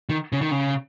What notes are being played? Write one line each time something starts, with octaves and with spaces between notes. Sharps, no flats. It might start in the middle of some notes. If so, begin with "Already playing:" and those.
D#3
C#3
D#3
C#3